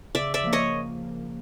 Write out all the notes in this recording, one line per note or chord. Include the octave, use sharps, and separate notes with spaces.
C#3 D5 E5
D5 E5
F3 A#3
C#5 D#5